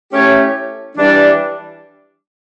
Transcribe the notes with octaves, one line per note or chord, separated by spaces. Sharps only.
A3 C#4 E4 G4 C#5
E3 G3 D4